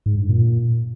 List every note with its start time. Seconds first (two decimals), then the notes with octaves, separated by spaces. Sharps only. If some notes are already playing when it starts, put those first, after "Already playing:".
0.06 G#2
0.17 G2
0.29 A#2